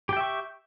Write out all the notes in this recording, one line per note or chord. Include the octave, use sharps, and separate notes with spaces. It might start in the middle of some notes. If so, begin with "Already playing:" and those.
G4 E5 G5 C#6